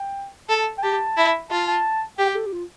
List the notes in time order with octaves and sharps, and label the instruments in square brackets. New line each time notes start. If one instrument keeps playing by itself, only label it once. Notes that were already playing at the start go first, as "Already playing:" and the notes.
Already playing: [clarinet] G5
[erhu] A4 [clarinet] A5
[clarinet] G5
[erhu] G4 [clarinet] A5
[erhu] E4
[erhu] F4 [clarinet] A5
[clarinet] A5
[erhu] G4 [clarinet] G5
[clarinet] G4
A4
G4
F4